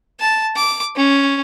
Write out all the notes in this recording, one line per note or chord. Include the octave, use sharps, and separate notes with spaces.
A5
D6
C#4